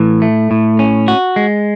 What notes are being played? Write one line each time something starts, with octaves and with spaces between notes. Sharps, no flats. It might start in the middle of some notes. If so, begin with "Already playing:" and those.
Already playing: A2 E3
A3
A2
C#4
F#4
G#3